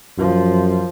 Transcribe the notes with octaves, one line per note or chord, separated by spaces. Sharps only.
F#2 F3